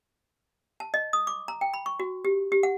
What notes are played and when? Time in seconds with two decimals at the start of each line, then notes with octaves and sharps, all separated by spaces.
0.80 A5
0.94 D#5
1.13 D#6
1.27 D6
1.48 A#5
1.61 G5
1.74 B5
1.86 C#6
2.00 F#4
2.25 G4
2.52 G4
2.63 F#5